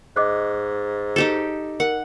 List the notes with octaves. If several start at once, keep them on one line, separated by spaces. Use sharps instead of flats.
G#2 D#5 D6 F#6
D#4 G4 A4
A#4 F#5